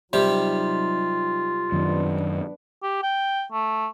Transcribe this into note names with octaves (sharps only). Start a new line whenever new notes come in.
C3 F#3 G3 D#4 F4 G4
F#2 D#3 B3 D4
G4
G5
A3